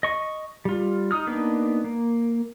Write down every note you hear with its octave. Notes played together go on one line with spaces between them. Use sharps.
D#5 C#6
G3 F4
D#4 D#6 F6
A#3 B3 D4 D#4 B4
A#3